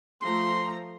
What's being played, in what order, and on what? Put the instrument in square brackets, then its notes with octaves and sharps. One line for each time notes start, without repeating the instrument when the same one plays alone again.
[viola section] F3 A3 A#5 [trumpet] C6